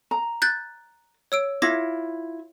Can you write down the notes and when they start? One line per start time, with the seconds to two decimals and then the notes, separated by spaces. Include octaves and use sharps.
0.11 A#5
0.42 F#6 G6 A6
1.32 C#5 E6 D7
1.62 E4 F4 D6 G#6 A#6